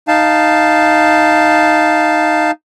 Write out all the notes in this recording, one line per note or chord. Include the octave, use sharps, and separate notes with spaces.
D#4 F5 A5